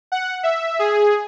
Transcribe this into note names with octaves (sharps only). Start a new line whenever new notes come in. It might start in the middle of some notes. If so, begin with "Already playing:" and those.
F#5
E5
G#4